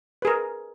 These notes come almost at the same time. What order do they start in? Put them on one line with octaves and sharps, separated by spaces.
B4 G#4 A#4